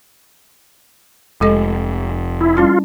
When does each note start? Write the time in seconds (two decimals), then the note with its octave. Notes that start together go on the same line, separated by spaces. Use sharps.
1.41 F1 G#3 A4 D#5
2.41 E4
2.57 G3 C#4 E4 F4